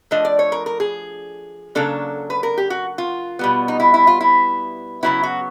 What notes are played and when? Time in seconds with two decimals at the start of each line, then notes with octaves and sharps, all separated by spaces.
0.11 F3 A3 D4 D#5
0.25 D5
0.39 C#5
0.52 A#4
0.66 A#4
0.80 G#4
1.75 C#3 F#3 A#3 D4 A4
2.30 B4
2.43 A#4
2.58 G4
2.70 F#4
2.98 F4
3.39 B2 G3 B3
3.68 D#4
3.80 E4
3.94 E4
4.07 F4
4.21 E4
5.03 C#3 F#3 B3 E4
5.23 F#4